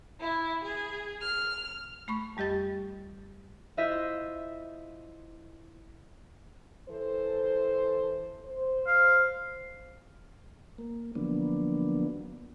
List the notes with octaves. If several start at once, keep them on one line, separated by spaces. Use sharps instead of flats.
E4
G#4
F6
A3 B5 C#6
F2 G3 G4 D#5 A6
E4 F4 C5 D#5 E5
E3 A4 C5
C5
F5
A#3
D3 F3 F#3 A#3 B3 D4